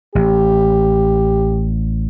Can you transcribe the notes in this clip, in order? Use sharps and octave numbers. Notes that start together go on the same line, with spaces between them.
A1 G4